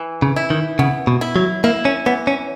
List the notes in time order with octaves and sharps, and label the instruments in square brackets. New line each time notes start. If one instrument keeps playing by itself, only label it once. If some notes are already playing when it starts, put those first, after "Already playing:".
Already playing: [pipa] E3
[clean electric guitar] C#3
[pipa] E4
[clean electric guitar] D#3
[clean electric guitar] C#3 [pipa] B3
[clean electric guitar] B2
[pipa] E4
[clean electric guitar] F#3
[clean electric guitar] A#3 [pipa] E4
[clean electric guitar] C#4
[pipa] E3 [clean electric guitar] B3
[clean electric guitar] C#4